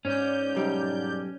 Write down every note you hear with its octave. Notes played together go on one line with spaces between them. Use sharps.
G#2 C#4 D5 G6
B1 G3 D#4